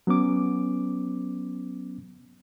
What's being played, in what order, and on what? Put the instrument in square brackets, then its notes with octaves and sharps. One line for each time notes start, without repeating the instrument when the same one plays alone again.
[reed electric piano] F#3 B3 C#4 D6